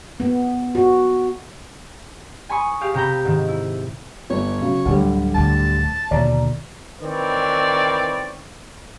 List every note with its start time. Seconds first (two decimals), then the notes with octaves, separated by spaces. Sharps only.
0.20 B3
0.75 F#4
2.49 G#5 B5 C#6 D#6
2.81 G4 G#4 F5
2.94 C3 G4 A#5 B5 G6
3.25 G#2 D#3
3.49 E4
4.30 G1 C#5
4.62 C#3 F#3
4.85 D1 D3 G3
5.35 D1 D2 A5
6.11 D#2 B2 D3 D5 A#5
7.00 D#3 E3 C4 B4 C#5 D5